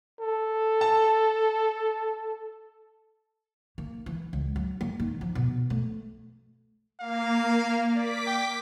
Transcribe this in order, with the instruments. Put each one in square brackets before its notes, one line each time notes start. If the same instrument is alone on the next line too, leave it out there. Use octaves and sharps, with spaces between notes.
[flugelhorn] A4
[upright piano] A5
[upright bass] A#3
E3
C#2
F#3
A#3
D#3
F3
B2
A3
[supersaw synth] A#3 [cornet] F5
[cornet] D5 [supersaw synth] D6 B6
[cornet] G5